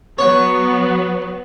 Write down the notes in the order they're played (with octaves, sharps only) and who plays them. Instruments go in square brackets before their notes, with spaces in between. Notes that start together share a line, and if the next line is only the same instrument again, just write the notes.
[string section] F#3 B3 [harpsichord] C#5